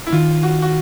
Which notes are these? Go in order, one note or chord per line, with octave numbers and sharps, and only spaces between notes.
E4
D#3 F4
F#4
F#4